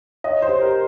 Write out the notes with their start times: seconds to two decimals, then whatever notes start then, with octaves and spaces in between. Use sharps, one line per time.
0.24 C#5 D#5
0.42 C5
0.49 G4
0.61 A#4